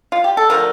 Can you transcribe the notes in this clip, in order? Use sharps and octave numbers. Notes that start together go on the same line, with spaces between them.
F4
G4
A4
D3 F3 A3 A#4